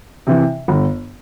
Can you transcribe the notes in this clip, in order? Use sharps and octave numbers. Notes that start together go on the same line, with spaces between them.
C3 E3
G1